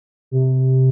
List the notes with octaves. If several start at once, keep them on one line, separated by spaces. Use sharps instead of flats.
C3